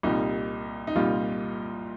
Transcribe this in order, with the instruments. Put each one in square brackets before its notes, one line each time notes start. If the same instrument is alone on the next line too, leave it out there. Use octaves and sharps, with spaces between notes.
[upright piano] C2 A#2 G3 D#4
D#4
C2 A#2 G3 F4